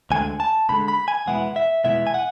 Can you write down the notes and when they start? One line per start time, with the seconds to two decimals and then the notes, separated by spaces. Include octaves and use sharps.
0.11 D2 D3 G#3 G#5
0.40 A5
0.69 D2 D3 G#3 B5
0.88 B5
1.08 G#5
1.26 E2 B2 G#3 B3 E4 F#5
1.56 E5
1.84 E2 B2 G#3 B3 E4 E5
2.07 G#5
2.14 F#5